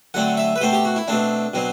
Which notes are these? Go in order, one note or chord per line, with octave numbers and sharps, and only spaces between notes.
D3 F#3 A3 C4 F#5
E5
B4
B2 A3 C4 C5
G4
F#4
E4
B2 A3 C4 D4
B2 F#3 C4